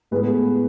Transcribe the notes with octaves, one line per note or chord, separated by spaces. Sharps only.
A2 G#3 B3 B4